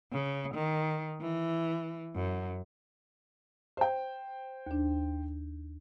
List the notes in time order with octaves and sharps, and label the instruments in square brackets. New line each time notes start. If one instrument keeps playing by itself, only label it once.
[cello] C#3
D#3
E3
F#2
[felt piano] C5 G5
[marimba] D#2 D4